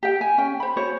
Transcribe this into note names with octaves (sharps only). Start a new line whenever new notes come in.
G4 G5
G#5
C#4 G5
C5 B5
F#4 C5 C#5